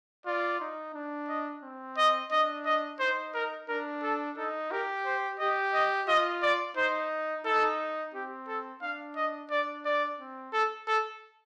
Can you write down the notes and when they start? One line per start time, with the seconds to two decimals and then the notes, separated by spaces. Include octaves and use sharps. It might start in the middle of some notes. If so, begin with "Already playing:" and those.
0.26 F4 D5
0.60 D#4
0.94 D4
1.29 D#5
1.63 C4
1.97 D#5
2.31 D4 D#5
2.65 D#5
2.99 D#4 C5
3.34 A#4
3.68 D4 A#4
4.03 A4
4.37 D#4 A4
4.71 G4 A#4
5.05 C5
5.39 G4 D#5
5.74 D#5
6.08 F4 D#5
6.42 D5
6.77 D#4 C5
7.45 D#4 A4
8.14 C4 G4
8.48 A4
8.82 D4 F5
9.16 D#5
9.51 D4 D5
9.85 D5
10.19 C4
10.53 A4
10.87 A4